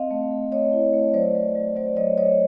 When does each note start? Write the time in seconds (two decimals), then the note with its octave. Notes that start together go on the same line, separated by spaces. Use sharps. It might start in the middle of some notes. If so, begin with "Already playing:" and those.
Already playing: C4 D#5 F5
0.11 A3
0.31 A3
0.52 A3 C#5 D#5
0.72 E4
0.93 A3
1.14 F#3 C5 D5
1.35 F#3
1.55 F#3
1.76 F#3 C5 D5
1.96 F#3 C#5 D#5
2.18 F#3 C#5 D#5